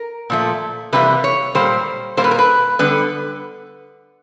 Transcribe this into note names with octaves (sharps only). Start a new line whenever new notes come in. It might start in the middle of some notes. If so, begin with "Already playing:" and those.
Already playing: A#4
A#2 F3 A3
C3 E3 G3 A#3 B4
C#5
A#2 G3 A#3 C5
A#2 G3 A#3 C5
B4
A#4
B4
D3 G3 B3 B4